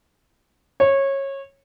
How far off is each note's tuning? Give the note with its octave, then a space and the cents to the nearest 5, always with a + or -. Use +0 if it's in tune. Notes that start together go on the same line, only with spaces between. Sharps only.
C#5 -20